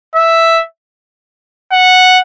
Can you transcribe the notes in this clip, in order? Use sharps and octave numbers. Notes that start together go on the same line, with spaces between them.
E5
F#5